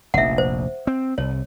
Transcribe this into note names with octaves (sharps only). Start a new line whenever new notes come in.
F1 A#1 E5 F#5
C5
C4
C2 C#5